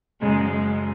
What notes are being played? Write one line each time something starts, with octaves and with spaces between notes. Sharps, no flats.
F#1 F#2 C#3 F#3 G#3
G#3